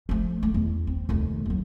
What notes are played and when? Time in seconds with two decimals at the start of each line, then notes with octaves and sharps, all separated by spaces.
0.09 F3 A3
0.43 A3
0.54 E2
0.87 C4
1.09 F1 D#2
1.46 D#2 F#3